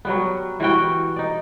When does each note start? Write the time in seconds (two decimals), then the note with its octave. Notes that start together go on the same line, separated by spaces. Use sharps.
0.05 F#3 G3 B3
0.60 E3 G3 F#4 G5
1.16 D#4 D5